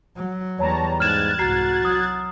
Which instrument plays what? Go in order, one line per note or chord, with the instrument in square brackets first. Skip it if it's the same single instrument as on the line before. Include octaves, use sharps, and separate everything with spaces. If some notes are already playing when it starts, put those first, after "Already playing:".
[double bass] F#3
[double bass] E2 G3 [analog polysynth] C#5 A5 A#5
[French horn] G#2 [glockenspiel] F6 E7 [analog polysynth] F#6 G#6 A6
[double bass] C2 G#2 [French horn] F#4 [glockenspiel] A#5 C7
[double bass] F#3 [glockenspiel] D#6